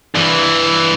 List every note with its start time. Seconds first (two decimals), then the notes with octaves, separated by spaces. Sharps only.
0.15 G2 E3